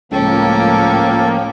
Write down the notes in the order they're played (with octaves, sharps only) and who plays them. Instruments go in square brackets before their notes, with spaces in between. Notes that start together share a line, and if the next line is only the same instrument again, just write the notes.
[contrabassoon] C#2 [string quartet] A2 C#4 G5 [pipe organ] F3 A#3 [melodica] A4